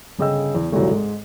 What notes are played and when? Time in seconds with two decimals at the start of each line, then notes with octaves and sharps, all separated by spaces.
0.18 G1 C#3 G#4 D#5 G5 E6
0.55 E2
0.72 G#1 D2 G2 C3 E3 F#3
0.91 G#2 G#3